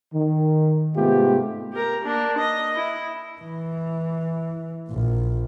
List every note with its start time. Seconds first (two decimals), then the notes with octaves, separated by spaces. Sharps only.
0.14 D#3
0.95 G#2 C3 A3 B3 F4 G4
1.73 G4 A#4
2.04 A#3 D4
2.38 D#5
2.76 E4
3.41 E3
4.89 A#1 A#2